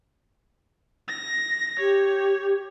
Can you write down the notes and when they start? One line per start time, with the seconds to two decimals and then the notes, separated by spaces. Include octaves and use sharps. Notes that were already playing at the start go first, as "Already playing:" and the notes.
1.08 A#6
1.79 G4 C#5